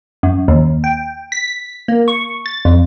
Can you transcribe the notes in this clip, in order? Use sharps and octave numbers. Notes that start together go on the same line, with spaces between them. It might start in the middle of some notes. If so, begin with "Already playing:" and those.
F#2
D#2
G5
B6
A#3
C#6
A6
F2